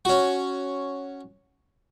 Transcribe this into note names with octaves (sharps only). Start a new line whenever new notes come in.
C#4 F#4